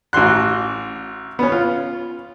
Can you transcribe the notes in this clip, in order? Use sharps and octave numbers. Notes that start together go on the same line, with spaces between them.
A1 F#4 C6 F#6
B3 C#4
F4